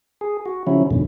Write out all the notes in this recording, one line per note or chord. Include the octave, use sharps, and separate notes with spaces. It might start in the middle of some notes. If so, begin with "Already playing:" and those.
G#4
F#4
C#3 F3 F#3 C#4 E4
F2 G#2 B2 D3